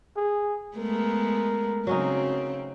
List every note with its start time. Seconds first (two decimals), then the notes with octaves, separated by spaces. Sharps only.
0.17 G#4
0.77 G#3 A3 B3 A#4
1.87 C#3 F#3 C4 C#4 D#4